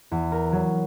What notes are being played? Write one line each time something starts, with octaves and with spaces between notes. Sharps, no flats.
E2
A#4
F#3